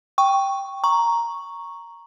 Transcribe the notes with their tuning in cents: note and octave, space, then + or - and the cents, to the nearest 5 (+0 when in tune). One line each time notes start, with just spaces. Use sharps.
G5 +0 C#6 +0
A#5 +0 C#6 +0